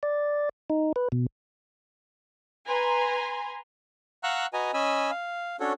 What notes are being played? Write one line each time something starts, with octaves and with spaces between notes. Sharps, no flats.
D5
D#4
B4
B2
B4 G#5 A#5 C6
F5 F#5 A#5 C#6 E6 F#6
F#4 B4 D#5 G#5 A#5
C#4 D#5 G#5 B5 E6
F5
C#4 D4 F#4 A4 C#5